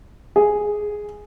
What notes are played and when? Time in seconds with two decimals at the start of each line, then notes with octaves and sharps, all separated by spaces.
0.36 G#4